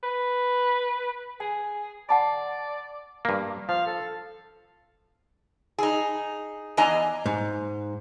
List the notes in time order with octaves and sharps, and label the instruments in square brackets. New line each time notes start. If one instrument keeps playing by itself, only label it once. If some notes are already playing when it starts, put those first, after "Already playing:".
[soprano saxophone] B4
[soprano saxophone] G#4 [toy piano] G#5
[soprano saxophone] D5 [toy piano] F#5 A5 B5
[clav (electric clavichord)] G2 A#3
[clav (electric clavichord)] F3 [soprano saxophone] F5
[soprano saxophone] A4
[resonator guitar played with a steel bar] D#4 G#4
E2 D4 D#5 G#5 A#5
[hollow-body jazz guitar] G#2